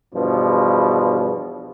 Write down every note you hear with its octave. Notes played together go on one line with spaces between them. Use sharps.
E2 G2 B2 F3